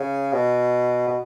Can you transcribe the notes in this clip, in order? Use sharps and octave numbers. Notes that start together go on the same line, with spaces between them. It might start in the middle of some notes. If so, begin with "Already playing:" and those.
Already playing: C#3
B2
B2